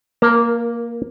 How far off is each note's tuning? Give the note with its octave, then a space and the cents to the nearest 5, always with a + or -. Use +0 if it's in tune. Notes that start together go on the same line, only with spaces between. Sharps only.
A#3 +0 A#4 +25 A5 +45